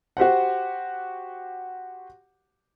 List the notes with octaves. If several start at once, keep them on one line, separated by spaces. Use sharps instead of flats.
F#4 G4 C5 F#5